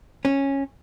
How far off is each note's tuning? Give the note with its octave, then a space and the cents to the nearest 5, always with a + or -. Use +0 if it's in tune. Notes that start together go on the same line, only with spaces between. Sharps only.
C#4 -10